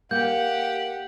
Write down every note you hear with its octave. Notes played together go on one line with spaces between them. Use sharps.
A#3 G4 F#5 G6